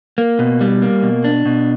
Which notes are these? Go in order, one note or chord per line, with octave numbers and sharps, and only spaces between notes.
A#3
B2
G3
A#3
B2
D4
B2